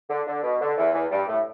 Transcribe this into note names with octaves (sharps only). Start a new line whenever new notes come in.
D3
D3
B2
D3
E2 E3
E2 E3
G2 G3
A2 A3